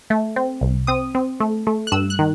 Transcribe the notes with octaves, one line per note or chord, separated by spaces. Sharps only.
A3
C4
C2
C4 D#6
C4
A3
A3
F#6
G2 E6
F#6
D#3